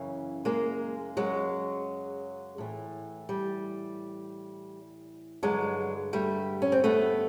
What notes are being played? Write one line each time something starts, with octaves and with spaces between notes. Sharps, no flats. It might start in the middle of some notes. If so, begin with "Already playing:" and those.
Already playing: F#2 C#3 E3
G#3 A#3
F#3 G#3
A2 E3
G3
G2 D3 F#3 G#3
G3 A3
C#4
C4
A3 B3